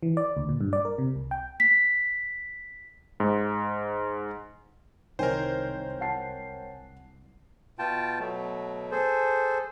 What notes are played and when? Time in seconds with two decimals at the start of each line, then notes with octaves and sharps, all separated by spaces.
0.03 E3
0.17 D5
0.37 D2
0.49 A#2
0.61 G2
0.73 D5
0.85 A#4
0.98 C3
1.16 C2
1.31 G5
1.60 B6
3.20 G#2
5.19 C2 D#3 A#4 C5 C#5 G5 G#5
6.01 F#5 A5 C7
7.79 B2 F4 G5 A5
8.19 B2 F#3 A3
8.91 G#4 A4 C5